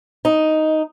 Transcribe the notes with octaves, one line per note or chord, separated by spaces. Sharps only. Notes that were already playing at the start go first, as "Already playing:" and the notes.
D#4